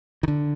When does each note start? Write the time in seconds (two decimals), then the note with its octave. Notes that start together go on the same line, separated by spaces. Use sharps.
0.23 D#3
0.28 D3